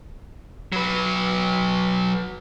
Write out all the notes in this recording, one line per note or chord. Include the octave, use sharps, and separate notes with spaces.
F#3 B4